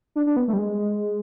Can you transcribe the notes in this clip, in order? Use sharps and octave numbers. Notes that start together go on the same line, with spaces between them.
D4
D4
B3
A3
G3
G#3